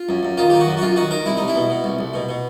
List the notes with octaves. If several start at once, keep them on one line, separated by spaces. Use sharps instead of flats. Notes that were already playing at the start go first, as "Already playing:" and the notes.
Already playing: F4
F#2
F#2
D#3 F4
D#3 G4
F#4
F#2
F#4
F#2 F4
D#3 F#4
D#3 A#4
C2 E4
C2 D#4
E4
B2
B2
C2
C2
B2
B2